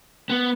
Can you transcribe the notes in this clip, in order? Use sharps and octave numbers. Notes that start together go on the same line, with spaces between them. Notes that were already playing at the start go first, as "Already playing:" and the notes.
B3